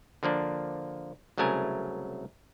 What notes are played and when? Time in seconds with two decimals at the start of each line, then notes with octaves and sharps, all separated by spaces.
0.23 D3 F3 A#3 D4
1.38 C2 C#3 F#3 A3 A#4 G#5